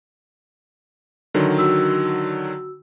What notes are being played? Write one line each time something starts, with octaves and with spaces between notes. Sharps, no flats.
D3 D#3 F#3
F#4 E6